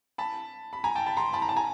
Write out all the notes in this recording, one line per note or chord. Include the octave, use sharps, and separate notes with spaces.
A5 B5
B5
G#5 A#5
G5 A5
A5 B5
A#5 C6
A5 B5
A#5
A5
G#5 A#5